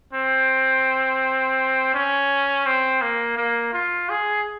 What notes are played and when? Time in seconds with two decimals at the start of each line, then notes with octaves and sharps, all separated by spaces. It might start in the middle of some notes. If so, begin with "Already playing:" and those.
0.13 C4
1.94 C#4
2.66 C4
3.01 A#3
3.37 A#3
3.73 F4
4.09 G#4